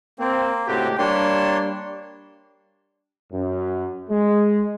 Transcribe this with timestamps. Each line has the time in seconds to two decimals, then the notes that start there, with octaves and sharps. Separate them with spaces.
0.19 A#3 C4
0.67 C#2 A2 C4 F#4 G4
0.98 G3 A#3 D4 C#5 C6
3.33 F#2
4.10 G#3